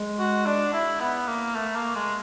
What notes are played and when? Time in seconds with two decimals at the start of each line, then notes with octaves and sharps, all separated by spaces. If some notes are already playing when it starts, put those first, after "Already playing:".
Already playing: G#3
0.19 F#4
0.46 D4
0.73 E4
1.00 B3
1.27 A#3
1.55 A3
1.75 A#3
1.95 G#3